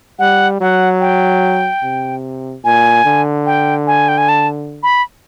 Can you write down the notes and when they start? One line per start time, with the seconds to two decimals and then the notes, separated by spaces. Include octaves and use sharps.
0.19 G3 F#5
0.61 F#3 F#5
1.01 G5
1.83 C3
2.64 A#2 G#5
3.05 D3
3.46 G5
3.87 G#5
4.09 G5
4.18 G#5
4.29 A5
4.83 B5